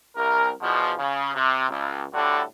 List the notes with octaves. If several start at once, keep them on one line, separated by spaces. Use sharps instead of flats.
C2 A#4
E2 B2 F3
C#3
C3
C#2
A2 D3 G3 D4 F#4 A4